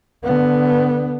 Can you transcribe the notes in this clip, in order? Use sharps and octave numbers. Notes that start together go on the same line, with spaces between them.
D3 B3